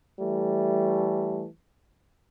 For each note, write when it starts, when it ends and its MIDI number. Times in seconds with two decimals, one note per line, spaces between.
0.20 1.46 52
0.20 1.46 55
0.20 1.46 57